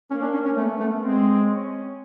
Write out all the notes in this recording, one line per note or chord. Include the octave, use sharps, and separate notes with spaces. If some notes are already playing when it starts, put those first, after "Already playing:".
A#3 C#4
D4
C#4
C#4
A3 B3
A3
G#3 C4
C#4